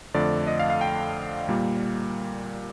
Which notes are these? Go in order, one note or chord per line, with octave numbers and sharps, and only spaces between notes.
F2 D3 A3 D5
D#5
F5
F5
G5
A#2 G3 A#3